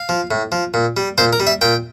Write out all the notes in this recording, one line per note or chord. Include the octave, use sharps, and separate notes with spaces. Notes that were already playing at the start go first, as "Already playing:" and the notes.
Already playing: F5
F3
A2
F3
A#2
G3
A#2 C5
A#4
G3
E5
A#2 G5